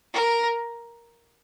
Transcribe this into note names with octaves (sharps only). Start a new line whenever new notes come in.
A#4